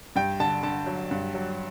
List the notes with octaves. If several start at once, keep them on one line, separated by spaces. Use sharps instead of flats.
G2 G5
D3 A5
D3 A5
F#3
G2
F#3